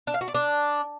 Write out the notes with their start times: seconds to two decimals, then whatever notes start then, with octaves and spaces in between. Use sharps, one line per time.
0.07 D4
0.14 F5
0.21 F#4
0.28 D5
0.34 D4